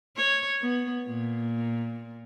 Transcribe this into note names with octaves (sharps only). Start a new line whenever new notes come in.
C#5
B3
A#2